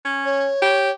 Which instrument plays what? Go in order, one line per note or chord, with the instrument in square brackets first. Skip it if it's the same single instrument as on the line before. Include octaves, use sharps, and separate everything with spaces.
[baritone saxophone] C#4
[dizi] C#5
[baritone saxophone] G4